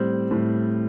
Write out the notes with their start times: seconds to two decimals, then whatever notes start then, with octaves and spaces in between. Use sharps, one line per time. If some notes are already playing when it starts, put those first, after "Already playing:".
Already playing: A2 G3 C4
0.31 A2